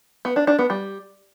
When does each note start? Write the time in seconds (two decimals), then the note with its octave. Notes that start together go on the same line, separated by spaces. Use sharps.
0.25 B3
0.36 D4
0.47 D4
0.59 B3
0.70 G3